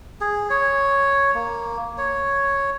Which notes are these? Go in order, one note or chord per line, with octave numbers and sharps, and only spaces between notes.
G#4
C#5
A#3
C#5